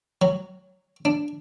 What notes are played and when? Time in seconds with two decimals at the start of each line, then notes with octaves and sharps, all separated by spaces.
0.22 F#3
1.05 D4